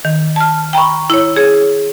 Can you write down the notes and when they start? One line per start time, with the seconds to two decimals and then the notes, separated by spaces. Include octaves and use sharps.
0.05 D#3
0.36 A5 F6
0.73 G5 A#5 B5 C#6
1.10 E4 C#5
1.36 G#4 C#5